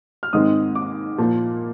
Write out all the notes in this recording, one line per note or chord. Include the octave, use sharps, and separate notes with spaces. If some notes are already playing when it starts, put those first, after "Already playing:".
F6
G#2 D#3 G#3 C4 D#6
D6
A#2 F3 A#3